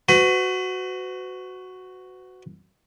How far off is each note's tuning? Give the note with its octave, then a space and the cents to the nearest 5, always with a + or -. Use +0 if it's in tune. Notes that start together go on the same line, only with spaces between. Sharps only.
F#4 +0 B4 +40